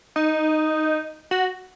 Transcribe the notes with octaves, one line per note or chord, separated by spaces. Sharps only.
D#4
F#4